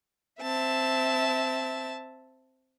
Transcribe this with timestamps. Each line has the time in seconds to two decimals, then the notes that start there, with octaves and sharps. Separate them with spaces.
0.41 C4 E5 A5